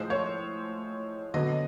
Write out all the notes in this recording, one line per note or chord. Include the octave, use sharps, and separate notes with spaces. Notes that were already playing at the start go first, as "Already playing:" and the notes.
Already playing: A2 F3 G#3 C5
C#5
D3 F#3 B3 D#5